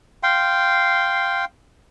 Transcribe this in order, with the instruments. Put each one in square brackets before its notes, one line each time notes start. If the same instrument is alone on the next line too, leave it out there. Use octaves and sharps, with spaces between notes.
[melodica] F5 G5 C6